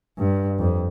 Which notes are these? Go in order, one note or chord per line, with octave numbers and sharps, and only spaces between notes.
G2
F2